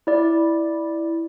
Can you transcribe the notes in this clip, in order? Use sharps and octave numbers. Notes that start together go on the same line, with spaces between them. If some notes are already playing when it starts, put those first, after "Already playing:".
E4 D5